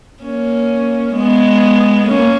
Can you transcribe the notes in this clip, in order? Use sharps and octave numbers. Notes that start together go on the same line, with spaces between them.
A#3 C#4
G#3 B3
A#3 C#4